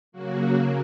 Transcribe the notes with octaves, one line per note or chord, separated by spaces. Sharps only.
C#3 F#3 A#3 F#4